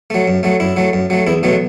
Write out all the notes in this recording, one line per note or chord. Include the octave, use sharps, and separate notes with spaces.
F#3 A3
F#2
F#3 A3
F#2 E4
F#3 A3
F#2
F#3 A3
E2 E4
B2 F#3 A3